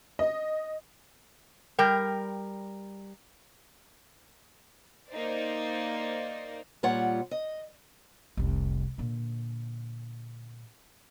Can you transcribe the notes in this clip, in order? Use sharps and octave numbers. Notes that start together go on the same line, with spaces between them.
D#5
G3 A#4 G5
A#3 D#4 C5 D5
A#2 G3 F4 C#5 F#5
D#5
F1 C2
A#2 D3